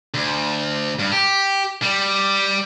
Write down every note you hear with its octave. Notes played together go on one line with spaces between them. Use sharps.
D2
G2
G4
G3